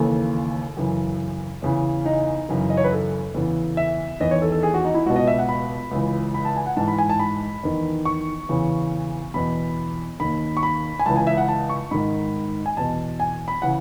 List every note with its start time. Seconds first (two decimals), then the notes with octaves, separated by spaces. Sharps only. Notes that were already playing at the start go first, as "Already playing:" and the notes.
Already playing: D#2 C#3 E3 A4
0.77 F#2 C#3 E3
1.62 E2 C#3 E3
2.05 D#4
2.49 F#2 C#3 E3
2.70 D#5
2.77 C#5
2.84 B4
2.92 A4
3.34 E2 C#3 E3
3.77 E5
4.20 E2 D#3 D#5
4.31 C#5
4.42 A4
4.52 A4
4.63 G#4
4.74 F#4
4.85 D#4
4.94 E4
5.06 C#2 B2 F#4
5.16 D#5
5.27 E5
5.38 F#5
5.49 B5
5.91 C#2 C#3 E3
6.34 B5
6.45 A5
6.56 G#5
6.66 F#5
6.77 G#2 E3 A5
6.88 B5
6.98 G#5
7.09 A5
7.20 B5
7.63 E2 D#3
8.05 C#6
8.49 E2 C#3 E3
9.34 E2 B2 B5
10.20 D#2 D#3 B5
10.57 C#6
10.63 B5
10.99 G#5
11.06 C#2 C#3 E3 A5
11.16 G#5
11.27 E5
11.37 F#5
11.48 A5
11.69 C#6
11.91 G#2 D#3 B5
12.66 G#5
12.77 E2 B2 A5
13.20 G#5
13.48 B5
13.62 C#3 E3 F#5